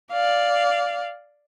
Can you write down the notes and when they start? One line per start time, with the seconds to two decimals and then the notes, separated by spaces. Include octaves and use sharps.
0.12 D5 F5